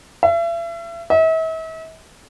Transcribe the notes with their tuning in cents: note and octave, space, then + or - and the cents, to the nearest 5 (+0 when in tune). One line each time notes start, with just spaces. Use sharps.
E5 +40
E5 -40